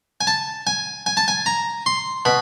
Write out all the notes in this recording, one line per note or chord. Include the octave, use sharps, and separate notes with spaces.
G#5
A5
G#5
G#5
A5
G#5
A#5
C6
B2 B5